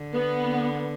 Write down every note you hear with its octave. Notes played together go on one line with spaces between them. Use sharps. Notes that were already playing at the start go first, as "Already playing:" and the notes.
Already playing: D3
B3